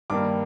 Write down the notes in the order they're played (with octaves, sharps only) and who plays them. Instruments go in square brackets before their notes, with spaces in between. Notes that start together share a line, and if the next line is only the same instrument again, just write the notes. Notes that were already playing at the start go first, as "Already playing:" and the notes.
[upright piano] G2 D#3 G3 A#3 D6